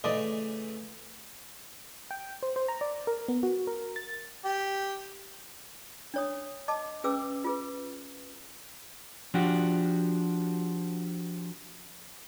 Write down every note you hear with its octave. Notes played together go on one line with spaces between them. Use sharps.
C#3 E3 A3 D5 D#5
G5
C5
C5
A#5
D5
A#4
B3
F#4
A#4
A6
G4
D4 C#5 D#6
D#5 A5 D6
C#4 G#4 B4 D6 E6
F4 G#4 B4
F3 D4 F#4 G4